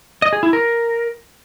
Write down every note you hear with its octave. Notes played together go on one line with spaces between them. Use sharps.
D#5
G#4
E4
A#4